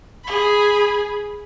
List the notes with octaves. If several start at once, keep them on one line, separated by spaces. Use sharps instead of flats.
G#4 B5